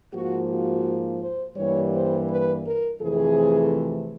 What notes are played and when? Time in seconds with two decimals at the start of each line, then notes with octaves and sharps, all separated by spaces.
0.13 G#2 F3 A#3 F#4
0.49 F#4
1.20 C5
1.56 G2 E3 G3 A#3 C#5
1.93 C5
2.29 B4
2.65 A#4
3.00 F2 C3 E3 A3 G#4